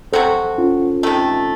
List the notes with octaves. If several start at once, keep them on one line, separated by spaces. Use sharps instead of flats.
C3 F#3 C4 F#4 A4 C5
C#4 F4
C3 D#3 A3